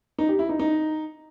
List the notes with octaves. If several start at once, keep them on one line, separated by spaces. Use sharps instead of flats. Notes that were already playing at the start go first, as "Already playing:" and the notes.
D#4
G4
E4
D#4
D#4